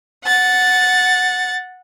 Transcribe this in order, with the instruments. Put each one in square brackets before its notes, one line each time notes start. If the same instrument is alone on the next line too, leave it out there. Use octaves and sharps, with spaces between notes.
[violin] F#5 A6